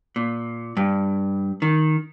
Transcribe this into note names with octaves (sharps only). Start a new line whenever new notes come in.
A#2
G2
D#3